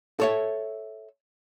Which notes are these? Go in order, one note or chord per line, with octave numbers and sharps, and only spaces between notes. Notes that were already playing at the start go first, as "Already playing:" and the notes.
A4 C#5 E5